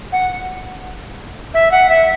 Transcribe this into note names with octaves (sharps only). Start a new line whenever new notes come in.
F#5
E5
F#5
E5